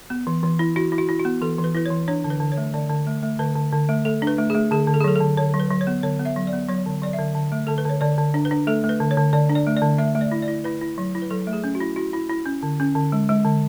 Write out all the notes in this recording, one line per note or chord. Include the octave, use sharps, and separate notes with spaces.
B3
E3
E3
E4
E4 F#4
E4
F#4
E4
F#4
B3
E3 A4
E3
B4
E4 B4
E3 C#5
D4 C#5
D3
B4
D3
C#5
A3
D3 D5
D3
A3
A3
D3 B4
D3
D3
A3
A3 A4
D4
B4
A3
A3 G#4
D3 G#4
D3
A4
G#4
F#3 A4
D3 A4
D3 C#5
F#3
B4
F#3
C#5
B3
D3 C#5
B3
E5
F#3
D5
B3
F#3 C#5
D3
F#3 D5
E5
D3
D3
A3
D3 A4
B4
D3 C#5
D3 D5
D3
D4
B4
D4
A3 A4
A3
B4
D3
C#5
D3
D3 D5
D4
D5
A3
D5
D3
A3 E5
A3
D5
E4
D5
E4
E4 B4
E4
F#3
E4
B4
F#3 A4
A3
G#4
C#4
F#4
E4
E4 F#4
E4
E4
C#4
D3
C#4
D3
G#3
G#3
D3